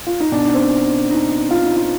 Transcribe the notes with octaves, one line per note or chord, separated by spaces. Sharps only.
F4
D#4
B2 D4
D#4
C4
D4
D#4
F4
D#4
F4